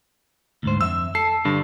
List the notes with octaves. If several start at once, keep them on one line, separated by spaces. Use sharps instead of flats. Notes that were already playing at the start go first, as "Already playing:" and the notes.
D2 G#2 C5
F2 E5 E6
A4 C7
G2 D3